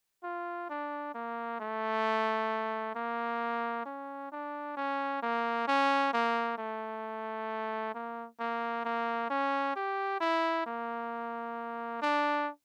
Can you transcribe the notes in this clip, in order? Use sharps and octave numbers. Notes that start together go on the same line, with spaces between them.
F4
D4
A#3
A3
A#3
C#4
D4
C#4
A#3
C#4
A#3
A3
A#3
A#3
A#3
C#4
G4
E4
A#3
D4